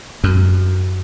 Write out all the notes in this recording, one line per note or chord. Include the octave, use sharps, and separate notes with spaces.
F#2